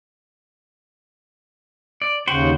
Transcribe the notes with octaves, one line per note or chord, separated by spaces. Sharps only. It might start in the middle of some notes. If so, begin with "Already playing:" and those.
D5
D#2 C#3 F#4 C5 G5